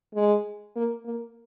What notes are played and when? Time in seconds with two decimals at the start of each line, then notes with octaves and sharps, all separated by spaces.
0.15 G#3
0.76 A#3
1.05 A#3